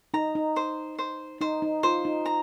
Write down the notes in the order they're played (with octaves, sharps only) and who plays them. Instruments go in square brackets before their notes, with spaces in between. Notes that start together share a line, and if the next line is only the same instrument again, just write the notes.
[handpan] D#4 [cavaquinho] A#5
[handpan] D#4
[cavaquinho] C5
C5
[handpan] D#4 [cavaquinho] C5
[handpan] D#4
[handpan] F4 [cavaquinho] C5
[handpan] D#4
[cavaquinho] A#5